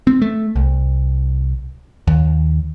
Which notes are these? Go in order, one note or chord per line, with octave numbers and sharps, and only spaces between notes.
C4
A3
C2
D#2